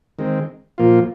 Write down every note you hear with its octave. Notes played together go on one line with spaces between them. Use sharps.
D#3 G#3 C4
A#2 F3 A#3 F4